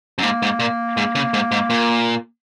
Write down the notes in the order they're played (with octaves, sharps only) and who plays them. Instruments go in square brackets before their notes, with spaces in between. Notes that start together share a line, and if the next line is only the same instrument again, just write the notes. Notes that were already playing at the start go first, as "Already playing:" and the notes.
[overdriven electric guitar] F#2
[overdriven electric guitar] G#2 [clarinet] A#3
[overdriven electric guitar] G#2
A#2
G#2
C#3
G#2
G#2
A#2